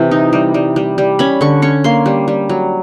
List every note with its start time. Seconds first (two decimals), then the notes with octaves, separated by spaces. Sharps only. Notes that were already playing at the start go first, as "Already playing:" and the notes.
Already playing: C3 E3
0.11 D#4
0.33 G3
0.54 G3
0.76 G3
0.98 G3
1.19 C#4 B5
1.41 D3 C#6
1.62 C#4 C#6
1.84 A#3 C6
2.06 G3
2.28 G3
2.49 F#3